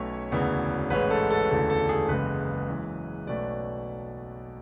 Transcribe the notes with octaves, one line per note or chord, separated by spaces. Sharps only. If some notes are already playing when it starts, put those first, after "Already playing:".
Already playing: B1 B2 A3 C#4 C#5
E1 D2 C#3 E3 B3
A1 G#2 G#3 C#4 B4
A4
A4
E1 D2 C#3 E3 A4
A4
G#4
F#1 E2 C#3 G#3 B4
F#2 E3 G#3
B1 B2 A3 C#4 D5